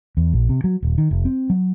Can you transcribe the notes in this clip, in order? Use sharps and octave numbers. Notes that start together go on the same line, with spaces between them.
E2
A#1
C3
F#3
D#1
D#3
F1
C4
F#3